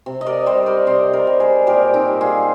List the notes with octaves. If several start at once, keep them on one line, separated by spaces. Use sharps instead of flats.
C3
D#5
A#4 D5
G3 C5 D#5
A#4 D5
C3 C5 D#5
A#4 D5
G3
G#4 C5
A#2 G4 A#4
C4 D#4
G3
F4 G#4